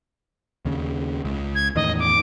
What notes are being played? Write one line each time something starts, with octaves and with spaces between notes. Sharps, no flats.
D#2 C#3
C#2
G#6
E2 A2 D#3 D#5
D6